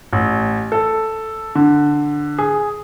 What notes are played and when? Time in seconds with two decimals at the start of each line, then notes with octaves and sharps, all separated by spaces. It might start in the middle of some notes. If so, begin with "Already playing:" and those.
0.13 A1
0.72 A4
1.55 D3
2.39 G#4